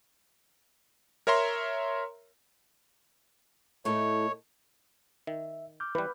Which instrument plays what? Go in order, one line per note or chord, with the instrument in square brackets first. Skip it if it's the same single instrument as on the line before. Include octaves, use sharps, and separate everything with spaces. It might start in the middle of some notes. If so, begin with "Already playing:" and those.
[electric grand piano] A#4 C#5 E5 A#5 C6
[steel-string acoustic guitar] A2 A3 D#4 [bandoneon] C#5
[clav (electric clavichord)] D#3 [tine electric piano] E5
[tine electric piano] D6 F6 G6
[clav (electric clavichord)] E3 G3 [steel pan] B4